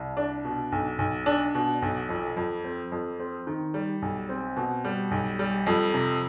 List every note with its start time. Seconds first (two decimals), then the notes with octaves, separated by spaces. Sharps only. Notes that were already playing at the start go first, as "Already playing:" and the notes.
Already playing: C2
0.17 D4
0.45 B2
0.72 B1
0.99 B1
1.26 D4
1.55 B2
1.82 B1
2.09 F2
2.37 F2
2.64 C4
2.92 F2
3.20 C4
3.47 D#3
3.74 G3
4.02 B1
4.29 C4
4.56 B2
4.85 G3
5.11 B1
5.39 G3
5.66 F2
5.94 C3